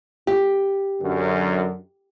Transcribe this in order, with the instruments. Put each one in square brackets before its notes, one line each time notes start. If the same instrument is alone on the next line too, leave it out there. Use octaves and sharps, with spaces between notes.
[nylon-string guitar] G4
[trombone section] F#2 D3